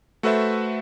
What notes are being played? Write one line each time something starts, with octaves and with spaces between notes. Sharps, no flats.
A3 F#4 A4 B4 C5 E5